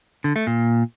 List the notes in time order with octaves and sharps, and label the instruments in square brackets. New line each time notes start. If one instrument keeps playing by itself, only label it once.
[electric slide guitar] D3
A3
A#2